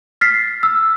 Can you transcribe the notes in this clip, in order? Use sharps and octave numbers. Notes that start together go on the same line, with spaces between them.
F6 A6 B6 C7
E6